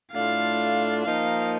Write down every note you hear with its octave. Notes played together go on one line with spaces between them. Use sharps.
A2 A3 D4 F4 F5
F3 A#3 D#4 F5